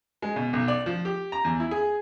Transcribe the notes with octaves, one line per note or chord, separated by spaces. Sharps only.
G#3
B2
B1
D5
F3
G4
A#5
E2
E4
G#4